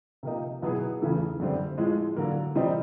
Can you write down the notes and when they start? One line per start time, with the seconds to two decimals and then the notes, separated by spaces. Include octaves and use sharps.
0.23 C3 F3 A#3 D#4
0.62 B2 F#3 B3 E4 G#4
1.01 E2 C#3 E3 A3
1.40 F#2 D3 G3 C4
1.78 A2 F3 G#3
2.16 D3 F#3 A#3
2.55 C3 E3 G3 C4 D#4